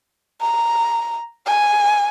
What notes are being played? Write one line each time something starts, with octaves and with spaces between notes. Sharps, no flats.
A#5
G#5